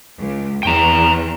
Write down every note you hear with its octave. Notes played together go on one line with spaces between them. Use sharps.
C#2
E2 G5 A#5